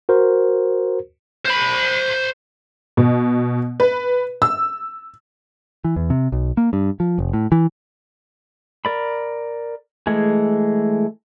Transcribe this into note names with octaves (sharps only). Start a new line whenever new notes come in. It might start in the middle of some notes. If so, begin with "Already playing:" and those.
F#4 A#4 C5
C5 B5
B2
B4
E6
E3
E2
C3
B1
A#3
G2
F3
F1
A2
E3
A#4 D5 B5
E3 G#3 A3 G#4